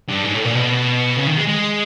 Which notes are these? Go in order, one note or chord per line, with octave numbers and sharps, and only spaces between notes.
G2
G#2
A2
A#2
B2
C#3
D#3
G#3
G#3